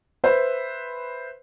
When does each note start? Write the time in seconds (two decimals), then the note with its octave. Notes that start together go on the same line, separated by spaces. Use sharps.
0.24 B4 C5 E5